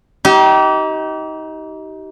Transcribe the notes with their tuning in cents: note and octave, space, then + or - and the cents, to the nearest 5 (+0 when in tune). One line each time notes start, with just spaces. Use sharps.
D#4 +25 G4 -30